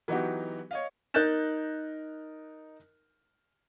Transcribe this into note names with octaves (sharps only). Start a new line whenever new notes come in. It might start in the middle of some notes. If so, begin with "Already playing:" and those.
E3 F#3 B3 D#4 F#4 G4
C#5 D#5 F5
D#4 A#4 F#6 G6 A6 E7